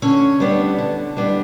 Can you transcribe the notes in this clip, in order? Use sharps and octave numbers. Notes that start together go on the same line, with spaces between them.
D3 C#4 C#5
G3 B3 D4
D3
G3 B3 D4